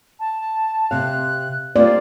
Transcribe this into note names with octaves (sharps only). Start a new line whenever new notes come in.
A5
C3 F5 F#6
G3 A#3 C4 F4 D5